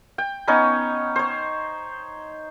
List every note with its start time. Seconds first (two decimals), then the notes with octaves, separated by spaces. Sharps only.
0.18 G5
0.48 B3 C#4 D#4 C#5
1.16 C5 C#5